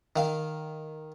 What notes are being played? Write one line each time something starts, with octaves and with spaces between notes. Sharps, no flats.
D#3 F5